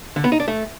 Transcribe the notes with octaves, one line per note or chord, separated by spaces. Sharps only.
D3
B3
D#4
D4
A3